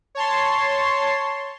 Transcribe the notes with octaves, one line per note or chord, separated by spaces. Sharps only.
C#5 A5 C6